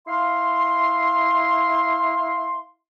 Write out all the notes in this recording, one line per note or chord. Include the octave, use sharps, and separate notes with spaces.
E4 F5 C6